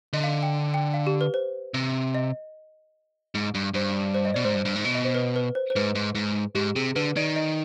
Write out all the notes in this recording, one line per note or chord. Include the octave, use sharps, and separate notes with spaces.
D3 D#5
F5
G5
G5
F5
G4
B4
C5
C3
D#5
G#2
G2
G2 C5
C5
D#5
B2 D5
G#2 C5
G2
G2
G#2
B2
D#5
C5
B4
B4
C5
C5
G#2 B4
G#2
G#2
G#2 G4
C3 G#4
D3 B4
D#3 D5
D#5